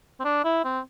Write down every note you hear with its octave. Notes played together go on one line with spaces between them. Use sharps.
C4
D4
E4
C4